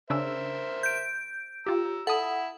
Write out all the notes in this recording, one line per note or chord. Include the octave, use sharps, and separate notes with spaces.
C#3 D4 A#4 C5 E5 E6
G6 D7
F4 G4 A#5 E6
E4 A4 F#5 A5 D#6